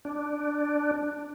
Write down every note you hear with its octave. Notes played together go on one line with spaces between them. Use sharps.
D4